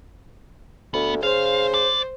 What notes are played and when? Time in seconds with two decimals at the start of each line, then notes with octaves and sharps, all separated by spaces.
0.94 D2 B3
1.23 C#3 C5 F5
1.74 D5